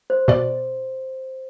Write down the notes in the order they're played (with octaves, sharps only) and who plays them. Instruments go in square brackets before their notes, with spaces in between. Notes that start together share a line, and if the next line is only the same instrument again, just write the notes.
[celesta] C5
[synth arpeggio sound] B2 D5